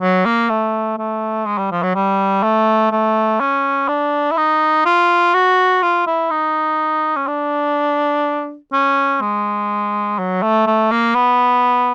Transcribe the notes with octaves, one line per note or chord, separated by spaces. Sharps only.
F#3
A#3
A3
A3
G#3
G3
F3
F#3
G3
A3
A3
C#4
D4
E4
D#4
F4
F#4
F4
E4
D#4
C#4
D4
C#4
G#3
F#3
A3
A3
A#3
B3